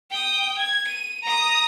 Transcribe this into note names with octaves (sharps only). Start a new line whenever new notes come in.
G5 D#6
G#6
D#7
A#5 D#6